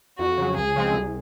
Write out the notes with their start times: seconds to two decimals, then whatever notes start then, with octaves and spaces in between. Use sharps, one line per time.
0.19 F2 F#4
0.38 C#3 F#3
0.57 C#2 G#4
0.76 C#3 F3 G#3 C4
0.94 C2